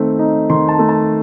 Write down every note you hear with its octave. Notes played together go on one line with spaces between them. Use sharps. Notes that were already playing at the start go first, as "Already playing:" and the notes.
Already playing: D#3 A3 C4
D#4
D#3 C6
A5
A3
A5